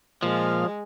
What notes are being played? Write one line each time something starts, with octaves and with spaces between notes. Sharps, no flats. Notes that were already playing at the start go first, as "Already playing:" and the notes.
A#2 F3 G#3 F5